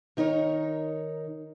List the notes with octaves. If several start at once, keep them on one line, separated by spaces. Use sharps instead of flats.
D#3 D#4 A#4 C#5